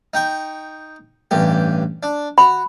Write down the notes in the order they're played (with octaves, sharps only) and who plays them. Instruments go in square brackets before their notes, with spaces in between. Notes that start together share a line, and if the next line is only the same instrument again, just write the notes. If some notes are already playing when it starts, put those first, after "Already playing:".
[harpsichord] D#4 G5 C#6
A1 G2 G4
D4
[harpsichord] F#4 [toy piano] B5